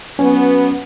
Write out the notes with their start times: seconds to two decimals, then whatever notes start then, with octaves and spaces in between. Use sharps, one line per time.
0.19 F#3 B3 C#4